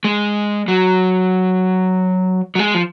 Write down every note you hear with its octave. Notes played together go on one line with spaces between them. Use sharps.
G#3
F#3
F#3
G#3
F3